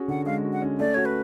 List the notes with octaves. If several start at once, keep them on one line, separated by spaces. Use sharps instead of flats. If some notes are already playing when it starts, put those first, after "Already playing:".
Already playing: C#4 F#4 G#4
D3 F#5
G#3 F5
F#4
F#5
C#4
A3 D5
F#4 C#5
B4